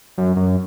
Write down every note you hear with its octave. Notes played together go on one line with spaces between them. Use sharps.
F#2
F#2